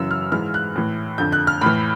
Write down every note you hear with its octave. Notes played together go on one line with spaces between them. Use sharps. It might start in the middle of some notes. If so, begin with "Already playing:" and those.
Already playing: F#2 C#3 E3 E6
F6
G#2 E3 F6
F#6
A2 E3
F2 D3 G6
F#6
F6
A2 E3 B5